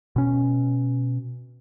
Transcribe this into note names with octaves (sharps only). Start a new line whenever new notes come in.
B2 C#4